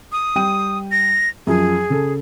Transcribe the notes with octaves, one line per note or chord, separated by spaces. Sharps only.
D#6
G3 G5 D#7
A#6
F#2 F3 G#4
C#3 A4